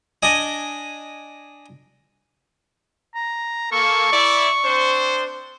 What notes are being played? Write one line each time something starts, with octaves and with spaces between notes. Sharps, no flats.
D4 D#5 G#5
A#5
A#3 A4 C#6
E4 D5
C4 D4 C5